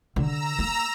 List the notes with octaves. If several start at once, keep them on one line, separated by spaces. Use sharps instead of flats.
D3 D4 A#5 E6
A#3